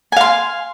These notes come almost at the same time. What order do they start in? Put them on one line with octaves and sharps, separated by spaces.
G#5 F5 C6